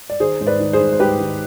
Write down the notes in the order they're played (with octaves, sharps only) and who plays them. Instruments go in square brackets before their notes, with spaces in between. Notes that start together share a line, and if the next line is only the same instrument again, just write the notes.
[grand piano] D5
D#3 G#4 C5
G#2 C5
B4 D5
D#3
G#4 C5
D#3
C5
G#2 G4 B4
D#3